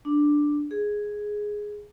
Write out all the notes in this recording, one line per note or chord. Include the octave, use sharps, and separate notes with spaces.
D4
G#4